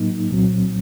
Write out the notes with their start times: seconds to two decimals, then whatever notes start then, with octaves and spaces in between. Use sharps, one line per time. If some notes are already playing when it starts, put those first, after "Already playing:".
Already playing: A2 F#3 A#3 D#4
0.30 C2 A#2 F#3 C4